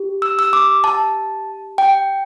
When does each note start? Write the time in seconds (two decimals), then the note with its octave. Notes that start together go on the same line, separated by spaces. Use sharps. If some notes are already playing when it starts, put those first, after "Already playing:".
Already playing: G4
0.22 E6
0.39 E6
0.53 D6
0.84 A5
1.78 G5